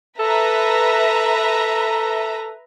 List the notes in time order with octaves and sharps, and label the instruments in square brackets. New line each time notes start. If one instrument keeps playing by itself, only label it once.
[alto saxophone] A4 [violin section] B4 E5 A#5